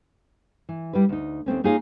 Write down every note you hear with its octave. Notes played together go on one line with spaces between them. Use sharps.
E3
G3 D4 E4 B4
D2 D#4
D#2 A3 C4 C#4
A#3 D#4 F4 G#4 C#5 F5